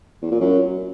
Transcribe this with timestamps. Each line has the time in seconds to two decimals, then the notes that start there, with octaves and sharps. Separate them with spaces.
0.22 E2
0.31 A#2
0.41 F#2